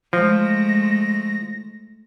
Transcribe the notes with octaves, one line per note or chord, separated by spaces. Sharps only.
F3 G#3 A3 A#6